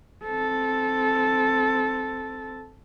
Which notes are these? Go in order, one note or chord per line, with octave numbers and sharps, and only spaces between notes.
C4 A4